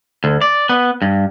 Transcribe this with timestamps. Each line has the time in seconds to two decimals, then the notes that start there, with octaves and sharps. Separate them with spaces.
0.24 D2
0.42 D5
0.69 B3
1.02 G2